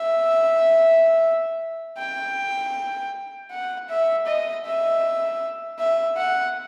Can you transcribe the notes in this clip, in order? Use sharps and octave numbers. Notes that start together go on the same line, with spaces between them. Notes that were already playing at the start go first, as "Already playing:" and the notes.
Already playing: E5
G5
F#5
E5
D#5
E5
E5
F#5